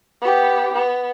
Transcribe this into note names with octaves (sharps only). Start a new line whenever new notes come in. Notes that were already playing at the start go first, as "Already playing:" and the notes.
B3 G4
B3